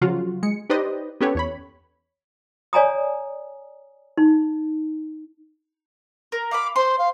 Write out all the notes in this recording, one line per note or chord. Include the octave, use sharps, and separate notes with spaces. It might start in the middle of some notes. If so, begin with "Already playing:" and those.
C#3 F3 F#3 F4 F#4
G#3 C#7
D#4 G4 B4 C5 D5 D#5
B3 C#4 G4 A4 B4 C#5
E2 C#5 B5
C#5 D5 G#5 A#5 D#6
D#4
A#4
F5 B5 D6
C5 C6
F5